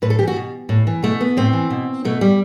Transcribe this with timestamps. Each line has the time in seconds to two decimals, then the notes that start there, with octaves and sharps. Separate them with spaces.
0.02 A2 B4
0.10 A4
0.19 E3 G4
0.28 F#4
0.36 B2
0.69 A2
0.87 E3
1.03 B2 A3
1.21 B3
1.37 A2 C4
1.53 E3
1.70 B2
2.05 B2 A3
2.21 G3